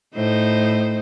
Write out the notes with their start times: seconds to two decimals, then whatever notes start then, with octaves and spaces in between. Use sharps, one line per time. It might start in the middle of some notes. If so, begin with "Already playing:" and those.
0.15 A2 D#4 C5